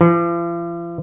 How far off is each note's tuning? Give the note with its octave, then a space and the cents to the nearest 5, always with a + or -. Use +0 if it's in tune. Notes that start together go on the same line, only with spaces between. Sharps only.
F3 -45